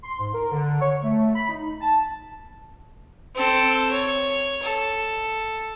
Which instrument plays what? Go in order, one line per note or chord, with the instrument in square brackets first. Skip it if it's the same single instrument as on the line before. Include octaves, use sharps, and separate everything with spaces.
[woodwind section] C6
G#2
A#4
D3
C#5
A3
B5
D#4
A5
[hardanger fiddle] C4 A4
C#5
A4